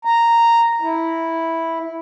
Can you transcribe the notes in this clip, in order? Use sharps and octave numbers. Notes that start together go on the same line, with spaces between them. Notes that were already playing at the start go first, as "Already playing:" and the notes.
A#5
E4